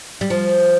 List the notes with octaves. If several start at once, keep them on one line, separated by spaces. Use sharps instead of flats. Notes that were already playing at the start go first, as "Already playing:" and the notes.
G3
F3